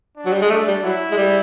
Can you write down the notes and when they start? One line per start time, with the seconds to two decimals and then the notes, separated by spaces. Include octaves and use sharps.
0.17 D4
0.26 F#3
0.33 G3
0.42 G#3
0.50 A3 D4
0.68 G3
0.83 F#3 E4
1.12 G#3
1.17 G3